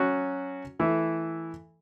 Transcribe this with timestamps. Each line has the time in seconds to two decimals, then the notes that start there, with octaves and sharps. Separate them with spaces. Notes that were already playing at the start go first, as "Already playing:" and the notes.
Already playing: F#3 C#4 F#4
0.79 E3 A3 E4